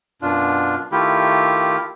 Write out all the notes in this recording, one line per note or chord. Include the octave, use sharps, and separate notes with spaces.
F#2 B2 D4 F4
D#3 A3 E4 F4 G4